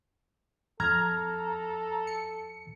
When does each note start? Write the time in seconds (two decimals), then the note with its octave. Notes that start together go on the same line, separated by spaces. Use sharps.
0.80 F2 A4 A#5 F6 G#6
2.07 C#7